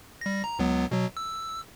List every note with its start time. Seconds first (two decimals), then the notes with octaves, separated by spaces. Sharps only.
0.21 G3 A#6
0.44 A#5
0.59 C#2 F#3 B3
0.91 B2 F#3
1.17 E6